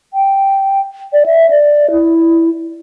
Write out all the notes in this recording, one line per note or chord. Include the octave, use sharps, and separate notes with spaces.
G5
D5
E5
D5
E4